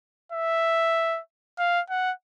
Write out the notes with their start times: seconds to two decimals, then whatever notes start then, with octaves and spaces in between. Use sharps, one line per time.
0.32 E5
1.59 F5
1.90 F#5